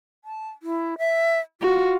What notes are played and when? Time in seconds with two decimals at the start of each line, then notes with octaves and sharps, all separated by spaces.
0.24 A5
0.63 E4
0.98 E5
1.61 F4 F#4